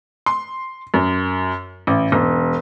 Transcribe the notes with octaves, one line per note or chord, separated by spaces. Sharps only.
C6
F#2
A1
E1